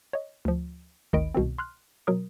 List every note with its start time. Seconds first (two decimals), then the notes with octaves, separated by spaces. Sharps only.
0.13 C#5 D#5
0.45 D2 F3
1.13 G#1 D2 D#3 D#5 B5 D7
1.34 C2 B2 D#3 C4
1.58 C6 F6 F#6
2.07 B2 F#3 A#4 D#6